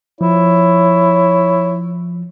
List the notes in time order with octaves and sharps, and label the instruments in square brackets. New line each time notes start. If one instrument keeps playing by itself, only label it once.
[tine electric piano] F3 [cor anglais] E4 [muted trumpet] C#5